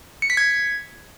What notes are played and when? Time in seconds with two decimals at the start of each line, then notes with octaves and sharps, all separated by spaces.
0.22 C#7
0.30 B6
0.37 G#6